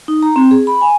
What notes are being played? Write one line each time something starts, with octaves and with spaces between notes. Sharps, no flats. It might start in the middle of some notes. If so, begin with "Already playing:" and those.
D#4
A#5
C4
G#4
B5
G#5